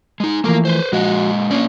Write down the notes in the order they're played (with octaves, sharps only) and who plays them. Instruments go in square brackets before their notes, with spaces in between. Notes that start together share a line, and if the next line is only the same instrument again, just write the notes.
[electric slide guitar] G#3 D#4
[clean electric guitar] E3 F3 A3 [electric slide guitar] A#3 A#4
[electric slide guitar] B4 C5
[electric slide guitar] A#2 G#3 D#5 [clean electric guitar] F3 F#4
[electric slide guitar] A#3 D4 D5 [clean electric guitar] C#4